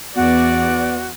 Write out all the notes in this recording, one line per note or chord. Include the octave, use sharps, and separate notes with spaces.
E2 B3 F#4 D5